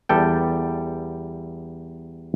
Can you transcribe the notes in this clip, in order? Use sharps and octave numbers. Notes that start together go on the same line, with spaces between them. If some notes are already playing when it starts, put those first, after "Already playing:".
E2 G3 A4 G5